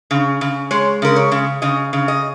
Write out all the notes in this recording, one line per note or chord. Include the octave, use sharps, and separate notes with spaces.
C#3
C#3
G#3 C#5
C#3 A#4
C#5
C#3
C#3 D#5
C#3
D#5